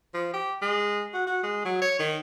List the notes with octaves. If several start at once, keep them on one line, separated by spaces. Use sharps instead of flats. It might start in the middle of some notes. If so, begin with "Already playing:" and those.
F3
G4
G#3
F#4
F#4
G#3
F#3
C#5
D#3